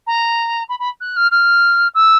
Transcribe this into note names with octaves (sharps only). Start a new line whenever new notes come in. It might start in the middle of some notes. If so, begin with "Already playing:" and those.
A#5
B5
B5
F#6
F6
F6
E6